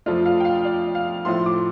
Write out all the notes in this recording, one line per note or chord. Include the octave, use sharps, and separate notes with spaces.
F2 F3 A3 F4 D5
F5
G5
F5
D5
F5
A2 F3 A3 C6
D6